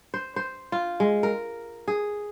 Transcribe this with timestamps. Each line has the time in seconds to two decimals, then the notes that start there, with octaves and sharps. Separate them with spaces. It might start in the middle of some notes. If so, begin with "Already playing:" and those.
0.14 C5
0.36 C5
0.72 F4
1.00 G#3
1.23 A#4
1.88 G#4